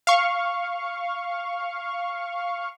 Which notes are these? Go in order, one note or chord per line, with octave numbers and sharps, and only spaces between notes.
F5 C#6